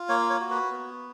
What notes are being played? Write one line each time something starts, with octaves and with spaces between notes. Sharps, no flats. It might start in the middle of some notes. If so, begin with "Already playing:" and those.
Already playing: F4
A#3 C#5
C#5
F#4
B4
B3